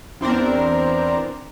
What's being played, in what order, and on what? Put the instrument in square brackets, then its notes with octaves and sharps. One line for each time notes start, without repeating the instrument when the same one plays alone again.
[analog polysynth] E2 C4 D4 A#4